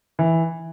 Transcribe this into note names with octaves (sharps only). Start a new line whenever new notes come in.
E3